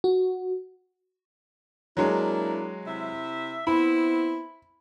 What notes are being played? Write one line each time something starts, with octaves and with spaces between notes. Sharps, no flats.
F#4
F#3 G#3 A#3 D4 E4
C3 E4 E5
B3 C4 E4 B5